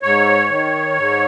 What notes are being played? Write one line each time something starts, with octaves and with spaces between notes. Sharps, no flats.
G#2 C#5
D#3
G#2